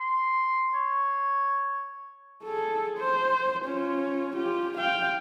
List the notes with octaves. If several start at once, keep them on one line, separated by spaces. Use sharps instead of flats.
C6
C#5
G#4 A4
C5
C#4 F4
F4 G4
F5 G5